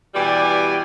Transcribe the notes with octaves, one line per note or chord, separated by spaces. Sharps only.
B2 E3 G3 G4 D5 G#5